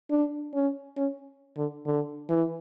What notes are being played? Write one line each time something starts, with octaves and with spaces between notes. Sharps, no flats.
D4
C#4
C#4
D3
D3
E3